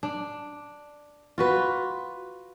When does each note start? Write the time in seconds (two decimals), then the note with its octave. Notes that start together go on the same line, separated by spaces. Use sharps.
0.03 D4
1.38 F4 F#4 B4